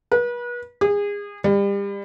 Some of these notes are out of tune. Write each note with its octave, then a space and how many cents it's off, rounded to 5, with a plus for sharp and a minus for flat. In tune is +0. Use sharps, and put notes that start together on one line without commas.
B4 -35
G#4 -30
G3 +35